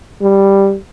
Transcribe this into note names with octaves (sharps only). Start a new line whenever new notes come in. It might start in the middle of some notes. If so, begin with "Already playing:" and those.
G3